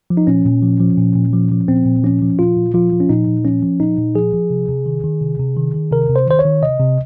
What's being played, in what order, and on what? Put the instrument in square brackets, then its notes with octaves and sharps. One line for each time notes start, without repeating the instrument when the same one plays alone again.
[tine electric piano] F3
D#4
A#2 C#4
A#2
F3
F3
A#2
A#2
F3
F3
A#2 C4
A#2
F3 C#4
F3
A#2 F4
A#2
F3 F4
F3
C#4
A#2 D#4
A#2
F3 C#4
F3
A#2 D#4
A#2
F3 G#4
F3
C3
C3
D#3
D#3
C3
C3
D#3
D#3
C3 A#4
C3
C5
D#3 C5
C#5
D#3
C3 D#5
C3